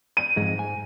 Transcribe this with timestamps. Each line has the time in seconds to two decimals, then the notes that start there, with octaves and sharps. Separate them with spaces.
0.17 D#7
0.37 F2 G#2 G#3
0.59 G#5